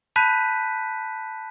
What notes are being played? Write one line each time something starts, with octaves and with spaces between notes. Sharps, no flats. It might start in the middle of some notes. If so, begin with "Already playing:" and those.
A5 B5 F#6 G6 B6 D#7